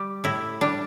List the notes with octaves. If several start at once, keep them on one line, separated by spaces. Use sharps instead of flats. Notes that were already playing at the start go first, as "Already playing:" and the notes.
Already playing: G3 G4
A2 E4
G3 D4